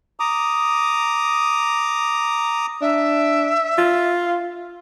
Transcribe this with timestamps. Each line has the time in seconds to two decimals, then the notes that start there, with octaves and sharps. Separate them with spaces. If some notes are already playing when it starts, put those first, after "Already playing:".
0.20 A#5 D6 D#6
2.81 D4 E5
3.78 F4